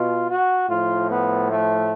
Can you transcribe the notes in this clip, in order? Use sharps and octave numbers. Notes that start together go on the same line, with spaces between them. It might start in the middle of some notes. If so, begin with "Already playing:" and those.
Already playing: B2 F4
F#4
A2 F3 F4
B3
A3